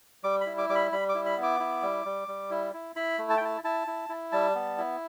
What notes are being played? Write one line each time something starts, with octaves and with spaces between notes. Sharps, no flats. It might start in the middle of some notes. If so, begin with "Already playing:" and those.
G3 D6
B5
E4
D6
G3 D6
B5
G3 B5
D6
E4
B5
B3
D6
E4
G3
G3
G3
E4
E4
E4 B5
A3
A5
G5
E4 A5
E4 A5
E4
E4
G3 A5
B3
E4